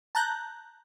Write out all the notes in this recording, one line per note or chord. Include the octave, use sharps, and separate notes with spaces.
A5 A#5 F#6 G6